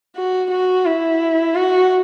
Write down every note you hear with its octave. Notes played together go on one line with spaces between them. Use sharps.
F#4
F#4
E4
F#4